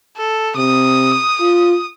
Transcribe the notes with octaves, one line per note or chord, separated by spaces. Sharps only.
A4
C3 D#6
F4